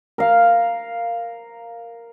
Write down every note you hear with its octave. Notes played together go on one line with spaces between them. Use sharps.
A#4 F5